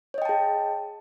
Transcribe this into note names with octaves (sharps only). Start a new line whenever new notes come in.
G#4 C#5 D#5 G5 A5